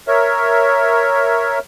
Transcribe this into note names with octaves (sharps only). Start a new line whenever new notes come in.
A#4 C#5 E5